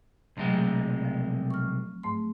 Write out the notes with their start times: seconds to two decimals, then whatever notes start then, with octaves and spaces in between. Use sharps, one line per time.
0.37 B1 C3 F#3 G#3 A3 C4
1.05 F3
1.51 C#6 F6
2.03 G#2 A3 C6